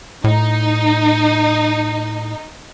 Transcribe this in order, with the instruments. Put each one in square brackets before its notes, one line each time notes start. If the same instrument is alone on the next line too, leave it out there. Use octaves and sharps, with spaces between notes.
[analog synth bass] A2 [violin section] D#4